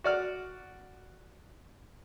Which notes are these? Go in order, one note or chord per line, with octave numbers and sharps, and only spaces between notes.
F#4 D5 F6